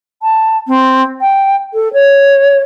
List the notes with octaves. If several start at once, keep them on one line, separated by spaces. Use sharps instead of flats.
A5
C4
G5
A4
C#5